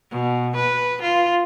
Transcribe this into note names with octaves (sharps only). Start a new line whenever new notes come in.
B2
B4
F4